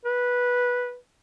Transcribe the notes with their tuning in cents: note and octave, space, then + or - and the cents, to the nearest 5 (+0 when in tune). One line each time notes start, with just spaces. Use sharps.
B4 -10